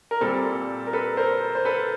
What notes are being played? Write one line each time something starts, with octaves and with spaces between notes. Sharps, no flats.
A#4
A#2 G3 C4 A4
A#4
A4 B4
A#4 C5
C5
A4 B4